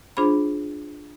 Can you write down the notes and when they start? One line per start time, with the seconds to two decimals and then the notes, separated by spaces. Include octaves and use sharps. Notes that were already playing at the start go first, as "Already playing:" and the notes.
0.17 D4 F4 G#4 C5 B5